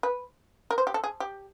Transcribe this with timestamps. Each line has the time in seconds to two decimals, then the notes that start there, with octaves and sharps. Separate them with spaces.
0.03 B4
0.71 A#4
0.78 C5
0.87 G4
0.94 A4
1.04 G#4
1.20 G4